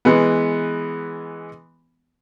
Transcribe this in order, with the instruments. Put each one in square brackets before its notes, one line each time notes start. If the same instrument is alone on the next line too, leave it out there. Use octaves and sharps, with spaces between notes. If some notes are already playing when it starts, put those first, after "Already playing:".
[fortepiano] E3 G#3 B3